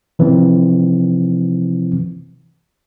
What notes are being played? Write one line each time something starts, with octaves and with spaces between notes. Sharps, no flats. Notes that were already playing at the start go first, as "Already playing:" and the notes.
C3 E3 F3 C4